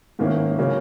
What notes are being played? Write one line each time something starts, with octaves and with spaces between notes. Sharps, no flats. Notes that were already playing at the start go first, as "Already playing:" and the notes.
G#2 D#3 A#3 C#4 E4
C#3 F#3 A#3 C#4